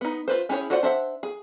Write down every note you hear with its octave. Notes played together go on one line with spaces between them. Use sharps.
B3 D#4
F4 B4 C5
C#4 E4 G4 G#4 C#5
F4 F#4 C5 D5 F#5
D4 C5 E5 F#5
G#4